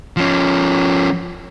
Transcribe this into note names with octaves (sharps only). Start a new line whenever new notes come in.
F3 C#4